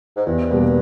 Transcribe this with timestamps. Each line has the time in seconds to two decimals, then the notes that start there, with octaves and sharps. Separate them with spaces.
0.17 G#2
0.26 E2 G2
0.51 B2 G3 A#3